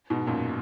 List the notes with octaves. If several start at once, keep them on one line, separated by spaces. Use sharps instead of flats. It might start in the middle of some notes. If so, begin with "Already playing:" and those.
G#2 B2
F#2 A#2